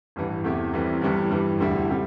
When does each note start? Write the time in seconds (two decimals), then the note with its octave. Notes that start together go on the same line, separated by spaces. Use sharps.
0.16 A1 G2 E3
0.44 E2 C3 A3 E4 G4
0.73 C2 C3 E3 G3
1.01 G1 G2 E3 G3
1.31 G2 E3 G3
1.58 E1 D2 D3 G3 E4
1.89 C3 G3